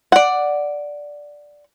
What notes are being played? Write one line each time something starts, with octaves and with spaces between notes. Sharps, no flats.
D5 F#5